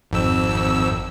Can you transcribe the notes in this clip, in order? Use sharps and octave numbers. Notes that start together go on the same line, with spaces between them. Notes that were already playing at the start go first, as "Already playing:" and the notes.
G#1 F2 E6